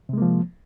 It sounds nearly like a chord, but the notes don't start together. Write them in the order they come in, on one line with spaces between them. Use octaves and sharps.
C3 G#3 A#3 F3